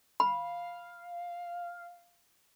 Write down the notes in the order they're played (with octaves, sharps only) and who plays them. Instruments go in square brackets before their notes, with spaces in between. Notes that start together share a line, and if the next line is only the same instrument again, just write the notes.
[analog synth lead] F5 [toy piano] B5